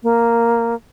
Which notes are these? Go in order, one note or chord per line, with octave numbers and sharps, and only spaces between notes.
A#3